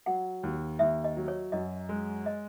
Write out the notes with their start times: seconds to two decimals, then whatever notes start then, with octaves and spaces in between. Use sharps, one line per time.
0.06 F#3 F#5
0.43 D#2
0.79 D#2 E5
1.04 D#5
1.17 F#3
1.28 C#5
1.52 F#2 D#5
1.89 G#3
2.26 D#5